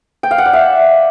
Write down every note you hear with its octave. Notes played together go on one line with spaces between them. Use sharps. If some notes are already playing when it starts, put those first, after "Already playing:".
G5
F5
F#5
D5
E5